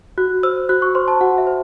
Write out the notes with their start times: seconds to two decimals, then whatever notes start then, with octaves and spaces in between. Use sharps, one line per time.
0.18 F#4 F#6
0.43 C5 E6
0.69 F#4 F#6
0.82 C#6
0.95 C5 C6
1.08 A5
1.21 F#4 F#5
1.38 E5
1.47 C5